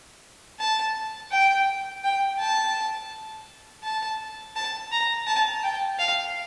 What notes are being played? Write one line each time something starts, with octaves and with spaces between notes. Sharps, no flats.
A5
G5
G5
A5
A5
A5
A#5
A5
G5
F5